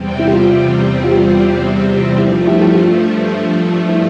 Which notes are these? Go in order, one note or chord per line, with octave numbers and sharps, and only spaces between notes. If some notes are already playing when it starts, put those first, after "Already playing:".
Already playing: E2 C3 G3 C4
E4
G4
F4
F4
G4
F4
G2 F3 A3 E4 G4
F4
E4 G4
E4 G4
F4
E4